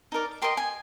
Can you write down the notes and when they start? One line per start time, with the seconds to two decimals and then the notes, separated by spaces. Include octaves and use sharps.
0.12 D#4 A#4 D5
0.42 G4 A#4 D#5 C6
0.57 G#5